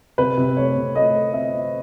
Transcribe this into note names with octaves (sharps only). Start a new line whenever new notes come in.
C3 B4
C3
A3 C#5
C3
A3 D#5
A3
C4 E5
C4